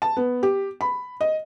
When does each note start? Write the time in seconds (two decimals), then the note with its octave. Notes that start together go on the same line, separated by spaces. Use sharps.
0.02 A5
0.17 B3
0.43 G4
0.81 B5
1.21 D#5